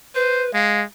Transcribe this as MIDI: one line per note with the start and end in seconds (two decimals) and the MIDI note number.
0.15 0.51 71
0.15 0.46 72
0.54 0.83 56
0.54 0.81 77